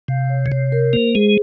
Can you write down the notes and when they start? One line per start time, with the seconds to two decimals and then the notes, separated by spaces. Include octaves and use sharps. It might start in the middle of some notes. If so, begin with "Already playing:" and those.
0.08 C3 F5
0.29 C#5
0.46 C#3
0.52 C3 C#5
0.72 A#4
0.93 A#3 C5
1.15 G#3 G#4